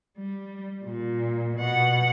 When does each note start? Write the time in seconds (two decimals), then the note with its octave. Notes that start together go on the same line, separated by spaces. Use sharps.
0.17 G3
0.85 A#2
1.57 B2 F#5